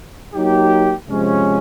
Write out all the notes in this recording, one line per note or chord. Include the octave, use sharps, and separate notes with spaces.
F#3 A#3 D#4 G4
C3 F3 G#3 C#4